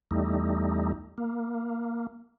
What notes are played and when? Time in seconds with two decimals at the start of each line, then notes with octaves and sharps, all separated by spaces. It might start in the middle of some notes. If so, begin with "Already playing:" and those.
0.11 E2 G3 A3 D#4
1.18 A#3